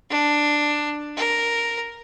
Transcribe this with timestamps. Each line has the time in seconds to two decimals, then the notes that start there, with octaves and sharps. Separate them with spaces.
0.10 D4
1.17 A#4